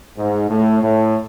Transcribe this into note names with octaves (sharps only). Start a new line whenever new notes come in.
G#2
A2
A2